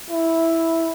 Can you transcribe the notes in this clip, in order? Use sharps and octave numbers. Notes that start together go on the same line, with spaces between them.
E4